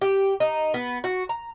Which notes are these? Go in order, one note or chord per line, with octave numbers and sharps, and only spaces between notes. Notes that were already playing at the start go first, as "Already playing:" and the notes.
G4
D#4
B3
F#4
A#5